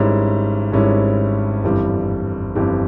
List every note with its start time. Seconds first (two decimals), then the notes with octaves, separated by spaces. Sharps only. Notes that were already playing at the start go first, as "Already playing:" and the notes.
Already playing: G#1 G#2 G3 C#4 E4
0.72 G#1 G#2 G3 C#4 E4
1.64 G1 F2 E3 G3
2.55 G1 F2 E3 G3